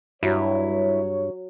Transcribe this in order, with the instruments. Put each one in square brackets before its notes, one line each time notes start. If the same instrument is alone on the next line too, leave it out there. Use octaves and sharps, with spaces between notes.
[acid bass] G2 [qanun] F#3 [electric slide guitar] E4 [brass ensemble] C#5